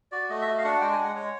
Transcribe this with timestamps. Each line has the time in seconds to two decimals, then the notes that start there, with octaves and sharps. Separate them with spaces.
0.12 F#4 D5
0.30 A3 D#5
0.41 E5
0.47 F#4 D#5
0.58 F5
0.64 D4 F#5
0.81 G#3 G5
0.92 G#5
0.98 G#3
1.04 F#5
1.16 G#3 C#5